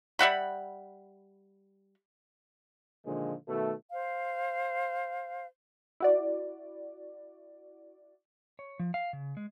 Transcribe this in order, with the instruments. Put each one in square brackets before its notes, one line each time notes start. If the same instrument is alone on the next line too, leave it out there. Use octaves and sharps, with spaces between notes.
[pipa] G3 E5 F#5 B5
[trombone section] A#2 D3 D#3 F3 G#3
B2 D#3 A3
[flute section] C5 F5
[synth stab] E4 F#4 D5
[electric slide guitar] C#5
F3
F5
C#3
G#3